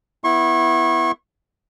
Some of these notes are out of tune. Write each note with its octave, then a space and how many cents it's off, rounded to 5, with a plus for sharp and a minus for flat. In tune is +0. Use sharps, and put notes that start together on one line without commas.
B3 +0 E4 +5 C#6 -35